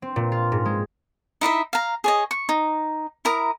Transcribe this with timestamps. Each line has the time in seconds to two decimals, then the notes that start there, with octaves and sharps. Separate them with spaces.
0.02 C4
0.16 A#2
0.32 F4
0.52 G#2
0.65 G#3
1.41 D#4 E4 D#5 E5
1.73 F5 A#5
2.04 G#4 C#5 D#5
2.31 C#6
2.49 D#4
3.25 E4 A#4 A#5 D#6